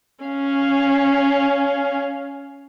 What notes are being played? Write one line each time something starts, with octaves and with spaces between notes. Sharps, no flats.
C#4 F5